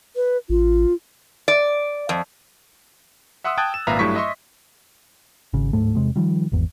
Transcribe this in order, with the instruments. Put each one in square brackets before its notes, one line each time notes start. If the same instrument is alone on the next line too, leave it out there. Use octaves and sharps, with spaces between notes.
[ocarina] B4
[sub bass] A1 [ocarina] F4
[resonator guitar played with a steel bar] D5
F2
[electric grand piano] E5 F#5 C6 D#6 E6
G5 A5 D#6 F#6 G#6 A6
E7
G#1 A#2 B4 E5 F5 A#5
G2 F#3 A3 E4 C#6 B6
D#5 E5 C6 C#6
[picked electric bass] G#1 C#3
D1 G#2 A3
E2 C3 G#3
D#3 F3 G3
G#1 E2